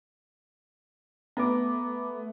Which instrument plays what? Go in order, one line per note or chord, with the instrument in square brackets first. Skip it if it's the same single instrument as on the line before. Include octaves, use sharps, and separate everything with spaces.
[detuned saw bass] A3 [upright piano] B3 [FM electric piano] A#5 D6